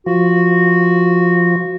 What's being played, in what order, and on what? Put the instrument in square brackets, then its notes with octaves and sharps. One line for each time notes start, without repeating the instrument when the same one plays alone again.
[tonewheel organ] F3 [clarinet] F#4